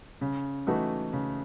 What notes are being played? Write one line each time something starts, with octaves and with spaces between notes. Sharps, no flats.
C#3
E3 A3 D#4 F#4
C#3